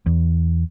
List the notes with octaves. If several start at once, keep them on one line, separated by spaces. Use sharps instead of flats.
E2